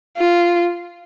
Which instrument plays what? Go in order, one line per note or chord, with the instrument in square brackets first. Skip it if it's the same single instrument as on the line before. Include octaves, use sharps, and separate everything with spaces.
[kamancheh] F4